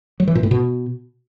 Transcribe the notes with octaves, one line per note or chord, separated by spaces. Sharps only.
F#3
E3
A#2
A2
B2